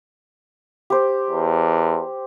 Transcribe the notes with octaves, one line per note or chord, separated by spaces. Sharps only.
G4 C5
E2